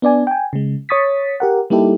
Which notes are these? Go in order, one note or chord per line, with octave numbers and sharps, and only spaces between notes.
B3 D4 D5 G#5
G5 G#5
C#3 G#3
C#5 C#6 D#6 A6 B6
G4 A#4 F#5
G3 A#3 D#4 E4 G4 A4